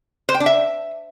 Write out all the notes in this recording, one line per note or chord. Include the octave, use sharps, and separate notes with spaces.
C5
G5
D4
E5